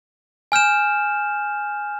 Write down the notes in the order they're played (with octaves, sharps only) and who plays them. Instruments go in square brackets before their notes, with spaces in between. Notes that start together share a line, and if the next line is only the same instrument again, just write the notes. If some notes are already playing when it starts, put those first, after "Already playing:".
[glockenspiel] G#5 F6 G6 E7